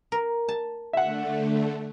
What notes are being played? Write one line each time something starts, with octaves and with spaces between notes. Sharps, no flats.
A#4
A5
D3 A3 E5 F#5